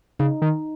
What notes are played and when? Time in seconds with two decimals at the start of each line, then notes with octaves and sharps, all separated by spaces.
0.20 C#3 D#4
0.42 D#3